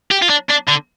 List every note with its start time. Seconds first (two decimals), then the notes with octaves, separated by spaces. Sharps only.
0.11 G4
0.22 F4
0.29 D4
0.49 D4
0.68 D3